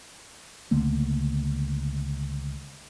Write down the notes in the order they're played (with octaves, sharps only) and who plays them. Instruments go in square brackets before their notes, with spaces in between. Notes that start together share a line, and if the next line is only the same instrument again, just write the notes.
[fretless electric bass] C#2 D3 A3 A#3